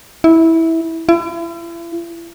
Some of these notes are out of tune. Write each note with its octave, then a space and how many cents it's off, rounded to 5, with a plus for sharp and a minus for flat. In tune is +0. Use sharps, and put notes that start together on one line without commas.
E4 -15
E4 +40